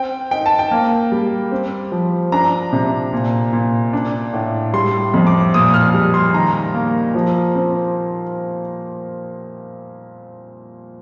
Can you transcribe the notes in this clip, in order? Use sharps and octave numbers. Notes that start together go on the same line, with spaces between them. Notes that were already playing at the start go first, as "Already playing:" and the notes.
Already playing: C4 G5
D#4 G5
A5
G5
A#3
G3
C4
F3
D4 A#5
C3
A#2
A#2
D4
A2
G3 C6
F2
D6
A#2 D#6
F6
G3
C6
D#3 A#5
A#3
F3
C4